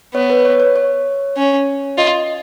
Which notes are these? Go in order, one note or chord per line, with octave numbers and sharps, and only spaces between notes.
B3 C#5
B4
C#5
C#5
C#5
C#4
F4 D#5